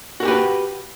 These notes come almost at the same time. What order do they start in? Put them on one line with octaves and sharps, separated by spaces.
F#4 A#4 G4 B4